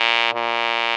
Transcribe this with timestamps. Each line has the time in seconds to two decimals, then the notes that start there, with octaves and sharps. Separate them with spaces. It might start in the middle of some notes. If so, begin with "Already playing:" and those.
Already playing: A#2
0.34 A#2